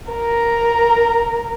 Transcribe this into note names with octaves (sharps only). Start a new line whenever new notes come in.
A#4 A#5